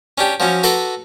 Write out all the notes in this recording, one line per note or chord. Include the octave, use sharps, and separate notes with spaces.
C#4 D4 G4
F3 F#3 C#4
F#4 A4 B4 A#5 C6 D6